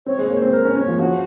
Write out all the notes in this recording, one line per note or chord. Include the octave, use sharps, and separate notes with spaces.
C4 C#5
G#3 C#5
A#3
C4 C5
A#4
C#4
C#4 C#5
F3
F3 F#4